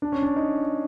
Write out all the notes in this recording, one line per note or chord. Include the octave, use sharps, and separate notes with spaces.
D4
C#4
D4
D#4